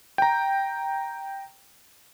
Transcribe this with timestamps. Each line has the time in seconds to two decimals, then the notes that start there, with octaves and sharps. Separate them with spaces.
0.18 G5 A#5